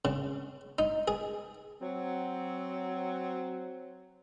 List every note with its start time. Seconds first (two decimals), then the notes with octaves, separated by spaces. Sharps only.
0.05 C#3
0.79 D#4
1.08 G#4
1.81 F#3 C4